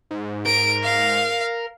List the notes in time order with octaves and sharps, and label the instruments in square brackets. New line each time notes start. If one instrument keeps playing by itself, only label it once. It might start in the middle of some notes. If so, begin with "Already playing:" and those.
[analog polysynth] G#2
[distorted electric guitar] A#4 [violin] D7
[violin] F5